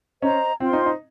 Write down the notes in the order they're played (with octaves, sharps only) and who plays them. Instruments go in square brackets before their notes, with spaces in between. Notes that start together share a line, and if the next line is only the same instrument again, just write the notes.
[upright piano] C#4 [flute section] C5 D#5 A#5
[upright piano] C4 [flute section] F4 C5 G5 C6
[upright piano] D#4
D#4